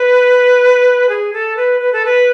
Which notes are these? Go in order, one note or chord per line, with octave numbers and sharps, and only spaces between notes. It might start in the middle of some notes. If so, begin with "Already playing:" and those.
Already playing: B4
G#4
A4
B4
B4
A4
B4